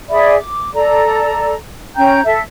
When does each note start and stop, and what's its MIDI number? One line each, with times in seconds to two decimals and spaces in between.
0.10 0.36 68
0.10 0.36 74
0.10 0.36 76
0.10 0.36 83
0.37 0.73 86
0.74 1.55 69
0.74 1.55 74
0.74 1.55 82
1.96 2.21 61
1.96 2.21 79
1.96 2.21 82
1.96 2.21 91
2.25 2.40 69
2.25 2.40 76